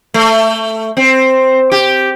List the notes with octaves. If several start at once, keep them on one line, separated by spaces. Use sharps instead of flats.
A3
C4
G4